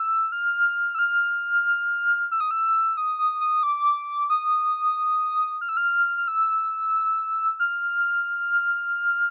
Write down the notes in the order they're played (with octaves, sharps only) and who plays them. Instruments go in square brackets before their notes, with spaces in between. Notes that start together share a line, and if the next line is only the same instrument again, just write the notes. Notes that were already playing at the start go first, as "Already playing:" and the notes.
Already playing: [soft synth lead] E6
F6
E6
F6
E6
D#6
E6
D#6
D#6
D#6
D6
D#6
F6
E6
F6
F6
E6
F6